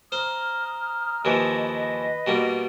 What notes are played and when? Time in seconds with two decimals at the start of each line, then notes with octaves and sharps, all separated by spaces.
0.12 C5 A#5 D#6 F6
1.25 D#2 E3 F3 B4 D#5
2.27 B2 G3 A#3